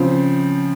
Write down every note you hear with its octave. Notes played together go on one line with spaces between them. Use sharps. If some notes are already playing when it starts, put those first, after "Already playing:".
Already playing: C#3 F3 C4